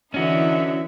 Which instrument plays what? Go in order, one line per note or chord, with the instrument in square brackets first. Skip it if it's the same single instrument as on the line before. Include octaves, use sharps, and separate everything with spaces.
[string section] D3 E3 D#4 [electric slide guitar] C#4 F#4 [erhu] E5